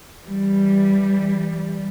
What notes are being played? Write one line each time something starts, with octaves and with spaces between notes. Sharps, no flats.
E3 G3